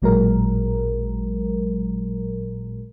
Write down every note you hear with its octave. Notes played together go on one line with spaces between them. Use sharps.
A1 A#2 F#3 G#3 A#4